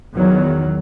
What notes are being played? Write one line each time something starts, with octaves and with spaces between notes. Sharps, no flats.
E2 D#3 F#3